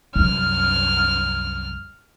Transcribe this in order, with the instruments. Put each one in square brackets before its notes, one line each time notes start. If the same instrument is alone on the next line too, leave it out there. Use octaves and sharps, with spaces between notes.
[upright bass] C2 F#2 [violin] F6